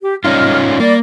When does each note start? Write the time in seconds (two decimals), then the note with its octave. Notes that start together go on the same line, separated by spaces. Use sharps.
0.03 G4
0.25 G3 C#4 D#4 F4 D#5 F6
0.80 G3 A#3 D5